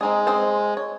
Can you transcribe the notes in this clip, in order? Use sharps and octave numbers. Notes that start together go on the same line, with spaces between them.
G#3 C4 D#4 G#4
C4 G#4 C5
C#5